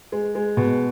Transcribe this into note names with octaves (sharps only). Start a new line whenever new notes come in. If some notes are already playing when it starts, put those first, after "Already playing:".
G#3
G#3
B2